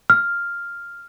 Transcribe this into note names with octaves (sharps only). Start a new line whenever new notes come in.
F6